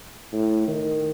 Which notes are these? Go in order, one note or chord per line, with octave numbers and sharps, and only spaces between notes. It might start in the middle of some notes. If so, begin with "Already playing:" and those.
A2
D#3